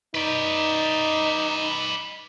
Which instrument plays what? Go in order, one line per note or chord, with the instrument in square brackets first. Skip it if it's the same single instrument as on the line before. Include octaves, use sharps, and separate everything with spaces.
[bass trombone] D#4 [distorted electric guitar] B4 D5